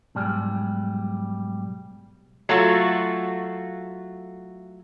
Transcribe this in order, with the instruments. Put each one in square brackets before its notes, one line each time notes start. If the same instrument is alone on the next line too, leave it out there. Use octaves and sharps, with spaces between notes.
[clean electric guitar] B1 G#2 G3
[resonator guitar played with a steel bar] F#3 A3 F4 F#4 A4